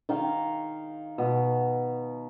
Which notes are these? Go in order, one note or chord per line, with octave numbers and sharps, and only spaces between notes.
D#3 F5
B2